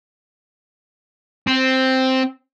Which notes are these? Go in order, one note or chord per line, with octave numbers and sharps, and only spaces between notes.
C4